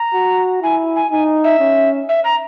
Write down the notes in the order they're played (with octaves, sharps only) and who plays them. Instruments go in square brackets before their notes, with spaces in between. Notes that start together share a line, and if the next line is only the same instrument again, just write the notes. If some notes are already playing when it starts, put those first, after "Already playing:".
Already playing: [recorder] A#5
[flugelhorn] F#4
[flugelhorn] E4 [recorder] G#5
[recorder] G#5
[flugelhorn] D#4 [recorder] G#5
[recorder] E5
[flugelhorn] C#4
[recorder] E5
A#5